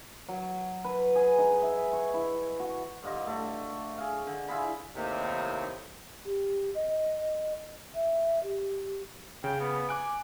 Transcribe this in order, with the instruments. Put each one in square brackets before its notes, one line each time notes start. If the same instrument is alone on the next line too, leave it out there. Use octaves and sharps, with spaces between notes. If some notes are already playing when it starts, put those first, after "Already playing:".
[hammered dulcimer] F#3
B4
G#4
D#4
E5
C#6
E4
F#4
G2 D3 F4 D#5
A3
G#4 F5
D3
E4 F4 G#4 B5
[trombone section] D#2 A2 C3 A#3 D#4
[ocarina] G4
D#5
E5
G4
[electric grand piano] C#3 [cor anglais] G5
[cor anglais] B3
[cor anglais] G#5 [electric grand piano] D6 F#6 D7